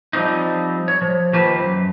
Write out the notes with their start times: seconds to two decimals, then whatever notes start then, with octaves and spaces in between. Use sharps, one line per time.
0.13 F3 G3 C4 D#4
0.88 C#5
1.02 F3
1.33 D#3 F3 A#3 G4 B4 C5
1.58 F#2